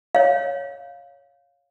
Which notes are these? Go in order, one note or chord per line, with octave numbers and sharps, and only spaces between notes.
C#5 F5